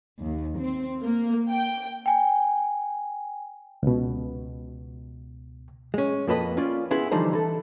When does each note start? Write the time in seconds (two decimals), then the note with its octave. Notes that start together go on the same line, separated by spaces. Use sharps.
0.22 D#2
0.59 C4
1.02 A#3
1.50 G5
2.06 G5 G#5
3.83 C#2 B2
5.94 G#3 C#4
6.27 F2 A#3 A4 B4 D#5
6.57 C#4 F4 D5
6.91 B3 C#4 E4 F4 G#4 B4
7.11 D3 E3 F3 G3 D#4 C5
7.33 E3 A4